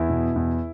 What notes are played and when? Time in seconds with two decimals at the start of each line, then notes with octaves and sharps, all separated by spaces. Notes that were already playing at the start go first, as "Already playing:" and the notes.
Already playing: E2 E4
0.10 B2
0.36 E2